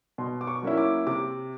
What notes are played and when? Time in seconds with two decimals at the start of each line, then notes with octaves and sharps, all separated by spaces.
0.18 B2 C6
0.41 D6
0.47 C#6
0.62 F#3 A#3 C#4 E4
0.78 D6
1.07 C3 D6